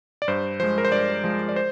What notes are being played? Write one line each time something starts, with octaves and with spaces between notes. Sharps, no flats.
D5
G2 C5
F3 G#3 C5
A#4
C5
G2 D5
F3 G#3
D5
C5